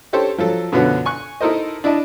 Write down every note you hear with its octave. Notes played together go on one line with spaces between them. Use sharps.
C#4 G4 A4 C5 C#5
F3 F#3 A4
F#2 B2 D3 F3 F#3 B3
G#5 C#6 F#6
D#4 E4 A4 A#4 C5 D#5
D4 E4 D5 D#5 A5